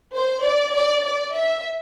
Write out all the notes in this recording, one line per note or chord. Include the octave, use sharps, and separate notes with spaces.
C5
D5
D5
D5
E5